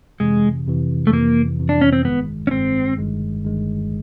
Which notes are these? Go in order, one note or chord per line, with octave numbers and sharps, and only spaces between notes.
F2 C3 E3 G#3
F2 C3 E3
A3
F2 C3 E3 A#3
F2 C3 E3
D4
C#4
C4
G1 G2 D#3 G#3 B3
C#4
G1 G2 D#3 G#3 C4
G1 G2 D#3 G#3
G1 G2 D#3 G#3